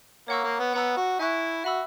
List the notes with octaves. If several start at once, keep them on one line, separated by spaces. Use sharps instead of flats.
A#3 C#5 F#5 C#6 E6
A#3
B3
B3 F#5 A#5 E6
F#4
E4 E5 G#5 C#6 F#6
F#4 E5 B5 E6